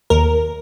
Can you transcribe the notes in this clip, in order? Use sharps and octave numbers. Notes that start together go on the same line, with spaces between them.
D#2 A#4